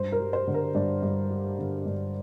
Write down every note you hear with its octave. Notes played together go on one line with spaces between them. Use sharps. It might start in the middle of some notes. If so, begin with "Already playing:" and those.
Already playing: G2 C5
A#4
G3
C5
D3
A#4
G2 D4
G2
G3
D3
G2